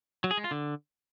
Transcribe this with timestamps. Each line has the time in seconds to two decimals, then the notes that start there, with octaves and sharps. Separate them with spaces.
0.24 F#3
0.31 G#4
0.38 G#3
0.44 F4
0.51 D3